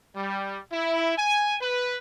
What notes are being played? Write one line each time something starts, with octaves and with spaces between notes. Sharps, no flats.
G3
E4
G#5
B4